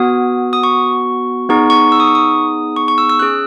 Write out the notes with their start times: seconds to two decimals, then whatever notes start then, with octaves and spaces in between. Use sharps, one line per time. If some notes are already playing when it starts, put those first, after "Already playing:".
Already playing: B3 F#4 D#6
0.53 D#6
0.63 C#6
1.49 B3 D#4 G#4 C#6
1.70 C#6
1.92 E6
2.00 D#6
2.07 C#6
2.15 D#6
2.76 C#6
2.88 C#6
2.98 E6
3.10 E6
3.19 C#4 G#4 F#6